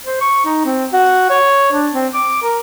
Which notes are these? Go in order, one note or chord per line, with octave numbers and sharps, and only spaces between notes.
C5
C#6
D#4
C4
F#4
C#5
D4
C4
D6
A#4